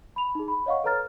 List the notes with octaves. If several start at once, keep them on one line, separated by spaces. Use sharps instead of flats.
B5 F7
D#4 G#4
B5
C#5 D#5 F5 F#5 C#6
A4 B4 C#5 A#5 F6 A6